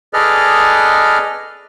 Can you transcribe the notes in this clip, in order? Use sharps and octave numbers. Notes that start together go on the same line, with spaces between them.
G#4 A4 B4 D5 D#5 F6